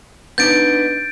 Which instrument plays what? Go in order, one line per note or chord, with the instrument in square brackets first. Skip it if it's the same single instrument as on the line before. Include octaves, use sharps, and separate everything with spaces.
[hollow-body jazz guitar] B3 D4 D#4 [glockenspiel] G6 A6 D7